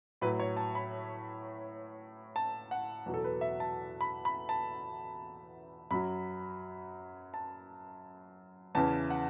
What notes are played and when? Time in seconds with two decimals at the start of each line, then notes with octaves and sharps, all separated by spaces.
0.21 A2 F#3 B4
0.40 C#5
0.57 A5
0.75 B5
2.36 A5
2.71 F#5
3.06 E2 B2 F#3
3.14 A4
3.24 B4
3.41 E5
3.60 A5
4.01 B5
4.25 B5
4.49 A5
5.91 F#2 F#3 B5
7.34 A5
8.75 E2 C#3 E3 A5
9.10 F#5